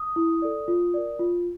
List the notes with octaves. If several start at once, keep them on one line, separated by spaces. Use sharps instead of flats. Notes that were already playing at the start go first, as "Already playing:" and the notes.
Already playing: D#6
E4
A4 D5
F4
A#4 D5
F4